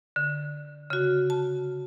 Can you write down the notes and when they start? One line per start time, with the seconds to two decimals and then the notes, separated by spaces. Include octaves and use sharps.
0.16 D3
0.90 C#3 F#4
1.30 A5